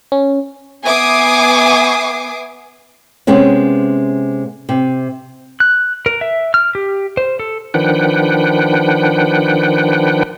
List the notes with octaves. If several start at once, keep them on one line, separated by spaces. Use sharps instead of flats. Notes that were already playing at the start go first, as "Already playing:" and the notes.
C#4
B3 E5 G#5 D6 D#6 C7
C3 G#3 B3 C#4
C3
F#6
A#4
E5
F6
G4
C5
A4
D#3 F3 D4 B4 F#5 G5